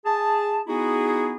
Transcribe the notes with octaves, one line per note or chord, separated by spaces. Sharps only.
G#4 A5
B3 D#4 E4 F#4 G#4